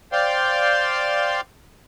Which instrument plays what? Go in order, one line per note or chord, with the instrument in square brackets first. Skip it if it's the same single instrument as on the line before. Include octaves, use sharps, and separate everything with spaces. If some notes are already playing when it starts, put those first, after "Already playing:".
[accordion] C5 D5 F5 G5 C6